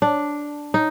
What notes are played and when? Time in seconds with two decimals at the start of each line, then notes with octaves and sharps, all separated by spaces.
0.02 D4
0.74 D#4